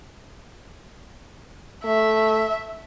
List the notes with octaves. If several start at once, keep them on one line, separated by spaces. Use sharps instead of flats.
A3 E5